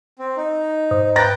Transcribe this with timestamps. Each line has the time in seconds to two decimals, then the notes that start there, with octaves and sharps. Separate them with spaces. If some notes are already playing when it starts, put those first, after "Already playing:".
0.19 C4
0.37 D#4
0.91 G#2 C5 D#6
1.16 B4 G5 A#5 A6 A#6